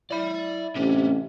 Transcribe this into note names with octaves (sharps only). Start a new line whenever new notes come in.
E4 D5 B5
A1 C3 C#4 D4